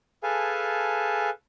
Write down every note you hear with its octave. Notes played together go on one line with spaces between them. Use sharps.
G#4 A4 B4 F5 G#5 A5